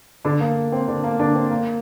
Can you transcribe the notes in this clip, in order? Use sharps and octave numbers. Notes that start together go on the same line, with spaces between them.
D3 D4
A#3
C4
D3 D4
A#3
D3 D4
C4
A#3